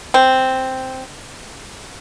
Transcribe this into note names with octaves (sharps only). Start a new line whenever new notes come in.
C4